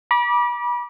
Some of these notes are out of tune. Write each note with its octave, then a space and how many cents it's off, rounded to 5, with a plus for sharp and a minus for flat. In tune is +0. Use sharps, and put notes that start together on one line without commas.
B5 -35 D6 +0